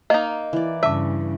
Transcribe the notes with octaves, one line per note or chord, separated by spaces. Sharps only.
A#3 D#4 D#5
E3 D5
G2 C#3 E5 A5 D6